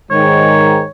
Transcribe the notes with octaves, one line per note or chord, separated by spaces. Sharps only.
G#2 D#3 C#5